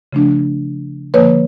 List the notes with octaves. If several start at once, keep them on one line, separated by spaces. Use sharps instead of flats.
C#3 F3 A3 D4
D3 F3 A#3 B4 C#5